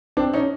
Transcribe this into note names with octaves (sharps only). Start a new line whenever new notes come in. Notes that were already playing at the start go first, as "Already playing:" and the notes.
C4 D4
C#4 D#4